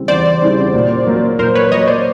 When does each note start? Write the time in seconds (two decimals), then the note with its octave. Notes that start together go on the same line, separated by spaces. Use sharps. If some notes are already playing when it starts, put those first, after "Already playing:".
Already playing: C#3 E3 G3 C4
0.08 E2 C5 D5
0.41 C#3 E3 G3 C4
0.74 A#2
1.07 F#3 A#3
1.39 A#2 A#4 C5
1.55 B4 C#5
1.71 F#3 A#3 C#5 D#5
1.87 C5 D5